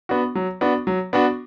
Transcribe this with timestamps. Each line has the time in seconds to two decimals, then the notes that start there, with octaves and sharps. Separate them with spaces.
0.09 B3 D4 F#4
0.35 F#3
0.61 B3 D4 F#4
0.87 F#3
1.13 B3 D4 F#4